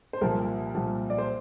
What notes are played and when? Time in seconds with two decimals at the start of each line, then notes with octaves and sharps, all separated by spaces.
0.13 C5
0.21 C2 A#2 F3 A#4
0.75 C2 A#2 F3
1.10 D5
1.18 C5